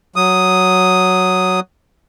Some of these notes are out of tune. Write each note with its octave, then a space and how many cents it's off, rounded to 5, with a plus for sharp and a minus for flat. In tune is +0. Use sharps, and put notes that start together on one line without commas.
F#3 +0 D#6 +0